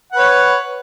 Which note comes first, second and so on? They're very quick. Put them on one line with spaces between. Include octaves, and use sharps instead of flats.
F#5 B4 C#5